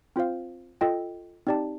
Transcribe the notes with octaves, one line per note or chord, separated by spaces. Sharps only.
C4 F4 C5 F5
F4 A4 D#5 G5
C4 D#4 G4 D5 A5